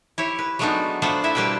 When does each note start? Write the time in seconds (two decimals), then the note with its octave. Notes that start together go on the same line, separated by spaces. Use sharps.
0.18 E4 G4 C#5
0.39 B4
0.59 F#3 G#3 A3 B3 D4 D#4
1.02 A3 B3 D4 F4 C5 F#5
1.24 A3 E4 E5
1.35 B2 G3 A#3 B4 C5 G5